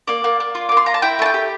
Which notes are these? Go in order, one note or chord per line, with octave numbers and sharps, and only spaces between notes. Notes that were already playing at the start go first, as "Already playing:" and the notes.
A#3 D5
A#3
A#3
F4
A#3 D6
C6
F4 A#5
A5
E4 G5
A3 A5
G5
G4